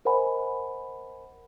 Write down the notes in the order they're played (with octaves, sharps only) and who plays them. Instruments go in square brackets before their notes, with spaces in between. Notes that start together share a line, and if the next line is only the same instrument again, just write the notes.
[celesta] A#4 C5 D#5 F#5 G#5 B5